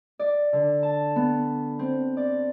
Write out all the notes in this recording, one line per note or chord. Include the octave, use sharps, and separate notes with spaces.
D5
D3
A5
B3
C4
D5